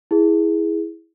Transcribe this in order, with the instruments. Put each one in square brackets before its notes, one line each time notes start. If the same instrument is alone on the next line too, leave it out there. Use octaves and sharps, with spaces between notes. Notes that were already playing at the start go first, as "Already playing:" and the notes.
[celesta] E4 G#4